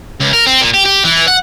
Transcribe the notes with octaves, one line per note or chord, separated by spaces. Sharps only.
C#2
A#4
C4
A#2
G4
G4
E3
F#5